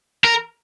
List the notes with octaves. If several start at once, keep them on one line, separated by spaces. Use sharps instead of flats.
A#4